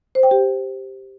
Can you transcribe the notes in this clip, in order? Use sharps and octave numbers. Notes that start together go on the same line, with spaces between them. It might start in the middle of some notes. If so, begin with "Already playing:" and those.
C5
G5
G4